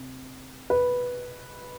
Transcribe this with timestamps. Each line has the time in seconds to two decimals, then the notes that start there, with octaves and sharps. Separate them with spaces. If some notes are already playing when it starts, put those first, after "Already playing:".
Already playing: C3
0.70 B4